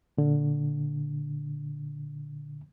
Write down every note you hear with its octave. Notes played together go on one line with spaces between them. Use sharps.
A#2 D3